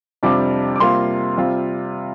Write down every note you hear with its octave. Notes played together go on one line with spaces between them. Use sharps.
F2 C3 G3 D4 F4 D6
D6
C3 G3 A#3 F4 C6
C3 G3 C4 F4